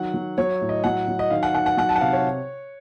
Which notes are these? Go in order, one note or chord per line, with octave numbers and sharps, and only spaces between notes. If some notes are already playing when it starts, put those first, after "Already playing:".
Already playing: D#3 F#3 F#5
F#3
F#3 C#5
A2
D#5
F#3 F#5
F#3
D#5
D#3 F5
F#5
D#3 F#5
F#5
F#3 F#5
A5
F#5
C3 F5
C#5